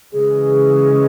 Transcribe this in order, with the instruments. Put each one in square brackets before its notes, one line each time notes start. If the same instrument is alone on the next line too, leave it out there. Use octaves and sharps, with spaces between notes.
[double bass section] C#3 E3 G#3 C#4 [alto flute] G#4